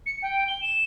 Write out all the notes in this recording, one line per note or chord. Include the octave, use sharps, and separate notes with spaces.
C#7
G5
G7
E7